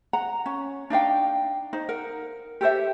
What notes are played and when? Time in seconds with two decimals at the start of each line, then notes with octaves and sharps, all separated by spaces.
0.13 F#5 A#5
0.46 C#4
0.90 D4 D#4 F5 G5
1.73 D#4 C5
1.89 A#4 F#5
2.61 G4 A4 C5 E5